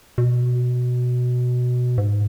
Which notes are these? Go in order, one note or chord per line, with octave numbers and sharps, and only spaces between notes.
B2
G#2